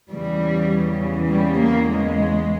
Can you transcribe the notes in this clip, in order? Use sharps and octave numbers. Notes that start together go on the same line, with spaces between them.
E2 C#3 E3 G3
E3
G3
A#3
G#3